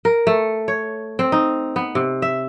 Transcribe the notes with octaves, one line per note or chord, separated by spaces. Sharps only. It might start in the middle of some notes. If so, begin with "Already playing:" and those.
A#4
A3
C#5
C4
D#4
B3
C3
E5